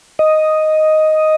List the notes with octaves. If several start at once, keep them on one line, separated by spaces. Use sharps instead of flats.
D#5